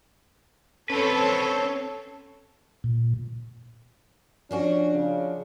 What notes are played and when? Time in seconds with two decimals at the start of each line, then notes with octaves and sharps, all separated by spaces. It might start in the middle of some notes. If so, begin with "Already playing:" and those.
0.90 C4 C#4 A4 B4 C#5
2.84 A#2
4.51 F3 C#4 D4 F#4
4.94 C#3